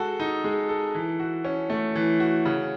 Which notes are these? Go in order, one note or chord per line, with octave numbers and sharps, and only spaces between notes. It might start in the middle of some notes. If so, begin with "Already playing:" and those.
Already playing: G#3 F#4 A4
D#4
G#3
A4
E3
F#4
C#4
A3
E3
F#4
C#3